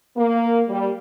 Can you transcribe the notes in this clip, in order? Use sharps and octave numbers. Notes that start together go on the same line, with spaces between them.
A#3
G3